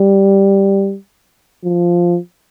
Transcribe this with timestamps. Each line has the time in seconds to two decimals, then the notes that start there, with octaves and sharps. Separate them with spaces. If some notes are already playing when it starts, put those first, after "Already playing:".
Already playing: G3
1.64 F3